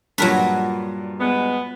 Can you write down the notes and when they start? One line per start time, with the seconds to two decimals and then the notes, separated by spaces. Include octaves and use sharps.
0.18 G2 A#2 F#3 A#4 B4
1.19 G#3 B3